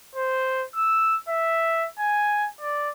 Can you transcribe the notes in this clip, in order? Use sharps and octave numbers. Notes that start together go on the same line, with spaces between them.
C5
E6
E5
G#5
D5